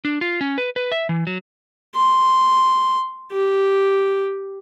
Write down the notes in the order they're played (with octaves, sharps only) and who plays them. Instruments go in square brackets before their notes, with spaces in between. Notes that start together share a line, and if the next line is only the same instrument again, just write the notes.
[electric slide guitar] D4
F4
C#4
B4
B4
E5
E3
F#3
[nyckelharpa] C6
G4